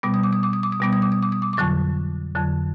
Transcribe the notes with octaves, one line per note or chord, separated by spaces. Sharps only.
B2 G3 B3 D6
D#6
D6
D#6
D6
D#6
D6
D#6
B2 G3 B3 D6
D#6
D6
D#6
D6
D#6
D6
D6
F2 D3 F#3 C#6
F2 D3 F#3